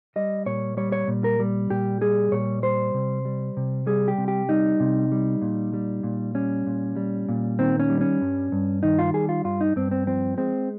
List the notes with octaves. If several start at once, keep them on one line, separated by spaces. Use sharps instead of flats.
G3 D#5
A#2 C#5
G3 C#5
C#5
A#2
A#4
G3
A#2 G4
G3 G#4
A#2 C#5
G3 C5
C3
G3
C3
G3 G#4
G4
C3
G4
G3 D#4
C3
G3
A#2
G3
A#2
G3 C#4
A#2
G3
A#2
D#3 C4
C#4
G3
C#4
G2
G2
D#3 D#4
F4
G3 G#4
F4
G2 F4
D#4
G2 C4
C4
F3 C4
G#3 C4